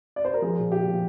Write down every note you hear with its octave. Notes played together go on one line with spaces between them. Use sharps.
D5
C5
A#4
F3 G#4
A#2
A#2 G4
F3